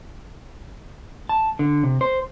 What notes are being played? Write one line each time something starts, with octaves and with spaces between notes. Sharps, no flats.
A5
D3
C3
C5